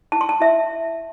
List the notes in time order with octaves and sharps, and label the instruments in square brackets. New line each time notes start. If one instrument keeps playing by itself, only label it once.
[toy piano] E4 A5
C6
A5
E4 E5